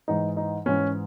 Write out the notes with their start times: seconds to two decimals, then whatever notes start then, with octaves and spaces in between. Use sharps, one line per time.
0.08 G#2 E3 D#4
0.37 D#4
0.66 G#2 E3 C#4